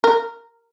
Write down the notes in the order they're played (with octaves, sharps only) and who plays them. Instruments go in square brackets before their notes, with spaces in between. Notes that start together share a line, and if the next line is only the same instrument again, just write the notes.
[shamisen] A#4